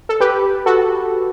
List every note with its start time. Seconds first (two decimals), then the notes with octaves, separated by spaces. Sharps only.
0.09 A4
0.20 G4 B4
0.66 F#4 A4